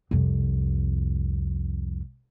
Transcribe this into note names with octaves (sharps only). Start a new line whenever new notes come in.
C2 F2